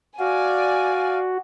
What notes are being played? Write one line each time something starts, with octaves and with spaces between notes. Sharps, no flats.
F#4 D5 F5 G#5